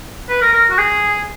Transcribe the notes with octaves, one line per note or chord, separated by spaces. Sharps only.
B4
A#4
A#4
F#4
G#4